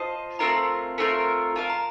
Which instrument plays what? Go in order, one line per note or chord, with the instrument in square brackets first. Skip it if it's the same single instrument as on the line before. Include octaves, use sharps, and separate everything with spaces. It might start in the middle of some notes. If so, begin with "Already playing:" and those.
Already playing: [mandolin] F4 C5 D#5 A5
[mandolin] A3 C4 F4 A#4 [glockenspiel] A#5
[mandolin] A3 C4 F4 A#4
[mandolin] F4 A#4 F5 [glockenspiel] A5
[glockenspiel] A#5